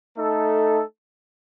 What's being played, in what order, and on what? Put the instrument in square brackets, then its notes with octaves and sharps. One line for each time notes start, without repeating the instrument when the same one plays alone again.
[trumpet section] A3 D#4 A4